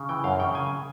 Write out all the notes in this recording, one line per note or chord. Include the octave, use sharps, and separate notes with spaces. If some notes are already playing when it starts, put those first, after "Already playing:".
Already playing: C#3
E3 G5
F#2 F5
C#3 G5
C#3 G#5